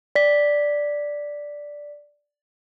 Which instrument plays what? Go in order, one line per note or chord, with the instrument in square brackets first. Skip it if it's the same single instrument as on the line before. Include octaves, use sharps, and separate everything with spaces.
[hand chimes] D5 B6